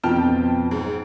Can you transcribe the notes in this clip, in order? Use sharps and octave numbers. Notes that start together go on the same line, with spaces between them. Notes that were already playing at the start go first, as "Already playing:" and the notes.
F2 B2 F3 G5 A5 F6
G#2